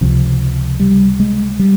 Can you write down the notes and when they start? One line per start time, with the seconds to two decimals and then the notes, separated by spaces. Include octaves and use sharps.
0.01 C#2 C3 F3
0.80 G3
1.20 G#3
1.59 G3